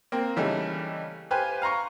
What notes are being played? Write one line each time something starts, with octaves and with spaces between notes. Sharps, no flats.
A#3 C4
C#3 E3 G3 A3 D#4
G4 B4 C5 F5 G#5
F5 A#5 C6 C#6